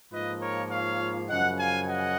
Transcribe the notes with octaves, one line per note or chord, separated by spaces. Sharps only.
G#2 F3 A#3 F4 B4 D#5
A#4 C#5
C#5 F5
F#2 C#3 F3 D#5 F#5
F5 G#5
D#5 F#5